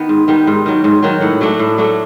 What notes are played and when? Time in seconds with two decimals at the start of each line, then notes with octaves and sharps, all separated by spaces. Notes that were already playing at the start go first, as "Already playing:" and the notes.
Already playing: D#3 B3
0.09 G#2
0.28 D#3 G3 B3
0.47 G#2
0.66 D#3 F#3
0.84 G#2
1.03 D#3 F#3
1.21 A2 F#5
1.41 F#3 A3 D4
1.59 A2
1.78 F#3 A3 D4